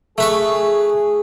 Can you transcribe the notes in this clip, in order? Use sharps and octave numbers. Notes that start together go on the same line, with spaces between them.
A3 G#4 B4 C#6